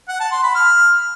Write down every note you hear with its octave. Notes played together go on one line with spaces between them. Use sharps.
F#5
A5
C6
B5
F6